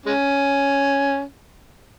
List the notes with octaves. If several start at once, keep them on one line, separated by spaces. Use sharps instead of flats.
G#3 C#4